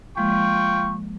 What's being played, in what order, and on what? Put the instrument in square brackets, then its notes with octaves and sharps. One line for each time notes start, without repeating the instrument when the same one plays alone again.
[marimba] F3 G#3 A#3 [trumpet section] F4 G5 C#6